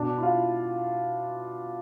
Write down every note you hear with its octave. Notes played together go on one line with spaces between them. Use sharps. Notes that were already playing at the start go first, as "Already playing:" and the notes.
Already playing: B2 D4
E4
F4